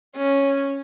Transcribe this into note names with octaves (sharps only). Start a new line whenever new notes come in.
C#4